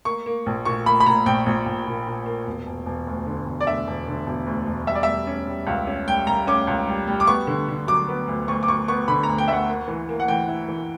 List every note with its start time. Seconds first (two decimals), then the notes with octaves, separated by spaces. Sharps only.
0.05 A#3 C#6
0.26 A#3
0.46 A#1
0.65 A#2 C#6
0.86 A#3 B5
1.00 B5
1.06 A#2 A#5
1.26 A#1 G5
1.46 A#1
1.66 A#1
1.87 A#2
2.07 A#2
2.26 A#3
2.47 E1
2.67 E1
2.86 E1
3.07 D2
3.26 D3
3.46 E1
3.61 D5
3.67 D3 E5
3.87 E1
4.07 D3
4.27 E1
4.46 D2
4.67 E1
4.87 G3 E5
4.95 D5
5.03 G3 E5
5.27 C#4
5.47 G3
5.67 C#2
5.87 C#4
6.07 G3 G5
6.27 G3 A#5
6.47 C#4 D6
6.67 C#2
6.88 G3
7.07 G3
7.20 D6
7.27 B3 C#6
7.47 D3
7.68 D3
7.87 F#3 D6
8.08 B3
8.28 D2
8.48 D2 C#6
8.63 D6
8.68 D2 C#6
8.88 B3 C#6
9.08 D3 B5
9.23 D2 A#5
9.38 G5
9.48 D2 E5 F#5
9.69 A#3
9.88 E3
10.09 A#3
10.20 F#5
10.28 E3 G5
10.48 E4
10.68 E3